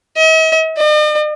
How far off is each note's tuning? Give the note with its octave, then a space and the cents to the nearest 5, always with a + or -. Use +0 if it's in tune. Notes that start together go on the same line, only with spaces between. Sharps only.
D#5 +45
D#5 -45